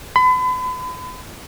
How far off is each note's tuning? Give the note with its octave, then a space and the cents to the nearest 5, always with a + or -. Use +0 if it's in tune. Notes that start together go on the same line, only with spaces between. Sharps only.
B5 +40